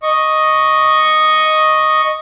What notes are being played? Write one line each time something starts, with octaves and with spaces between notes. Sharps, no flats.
D#5 C#6